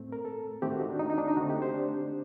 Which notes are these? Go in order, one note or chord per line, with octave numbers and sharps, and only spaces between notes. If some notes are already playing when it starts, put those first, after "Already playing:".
Already playing: A2 A3 C4
A#4
A4
D#3 A3 C4 G4
F#4
D#4
D4
D#4
D#4
D4
D#4
D3 A3 C4 F#4
G4
C5
D4